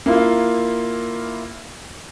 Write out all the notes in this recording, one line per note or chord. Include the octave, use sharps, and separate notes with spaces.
A#3 E4 F4